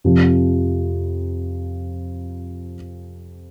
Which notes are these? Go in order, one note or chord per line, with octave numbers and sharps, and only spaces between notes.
F2 C3 F3